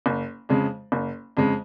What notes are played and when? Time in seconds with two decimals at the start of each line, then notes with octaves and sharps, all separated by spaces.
0.06 F#1
0.49 F2 C#3 G#3
0.92 F#1
1.37 F2 C#3 G#3